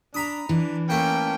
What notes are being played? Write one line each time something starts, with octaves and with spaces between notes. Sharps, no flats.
D4 A#5 B5 D#6
E3 D4
A3 A#3 C#4 G5